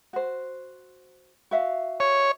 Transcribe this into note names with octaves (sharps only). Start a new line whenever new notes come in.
F#4 C5
F#4 E5 F5
C#5